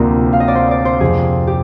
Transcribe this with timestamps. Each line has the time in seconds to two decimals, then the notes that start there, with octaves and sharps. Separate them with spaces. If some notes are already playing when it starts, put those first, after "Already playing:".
Already playing: D2 C3 F3 A#3 C4 D4 F4 A#4
0.33 F5
0.40 D#5
0.48 D5
0.55 C5
0.71 D5
0.85 C5
1.00 F2 C3 F3 G#4
1.47 G4